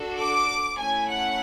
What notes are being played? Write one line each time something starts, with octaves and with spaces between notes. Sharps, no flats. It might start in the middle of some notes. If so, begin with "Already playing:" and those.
Already playing: D4 F#4 A4
D6
A3 C#4 E4 G#5
F#5